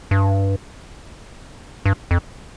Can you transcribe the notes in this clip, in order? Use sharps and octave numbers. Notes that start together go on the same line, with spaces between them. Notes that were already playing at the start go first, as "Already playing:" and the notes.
G2
G2
F2